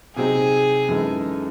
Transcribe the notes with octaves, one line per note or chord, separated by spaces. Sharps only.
C3 F#3 C4 D#4 G#4
F#2 E3 G#3 D#4 A4